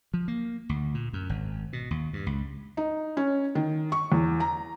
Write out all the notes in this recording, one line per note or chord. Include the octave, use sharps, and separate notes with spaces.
F3
A#3
D2
A#2
F#2
G#1
B2
D#2
G2
C#2
D#4
C#4
D#3
C#6
E2
A#5